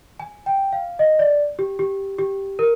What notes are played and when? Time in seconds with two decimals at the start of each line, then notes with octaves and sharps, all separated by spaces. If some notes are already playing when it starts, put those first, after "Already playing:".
0.20 G#5
0.46 G5
0.73 F5
0.99 D#5
1.19 D5
1.59 G4
1.79 G4
2.19 G4
2.59 A#4